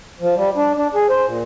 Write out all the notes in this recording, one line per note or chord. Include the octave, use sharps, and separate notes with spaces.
F3
G3
D4
D4
G#4
C5
A#2